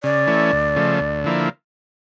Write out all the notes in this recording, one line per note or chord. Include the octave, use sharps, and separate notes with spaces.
C#3 D5
E3 A3 C#4
D2
C#3 F3 A3
D2
D3 F3 A#3 E4